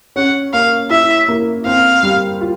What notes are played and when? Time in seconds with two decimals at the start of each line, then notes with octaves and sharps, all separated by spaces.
0.16 C#4 F#5
0.53 A#3 F5
0.90 E4 E5
1.28 A#3
1.66 C4 F5
2.03 G3
2.41 F4